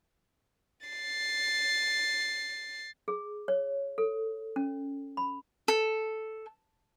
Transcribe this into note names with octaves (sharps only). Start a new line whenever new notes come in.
A6 C7
G#4
C#5
A4
C#4
B5
A4